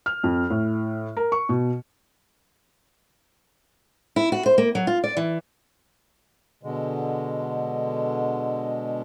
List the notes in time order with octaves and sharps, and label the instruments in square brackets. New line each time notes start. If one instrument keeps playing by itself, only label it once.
[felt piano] F6
F2
A2
A#4
C#6
B2
[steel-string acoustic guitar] E4
F#4
C5
A#3
F#3
F4
D5
E3
[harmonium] B2 D3 G#3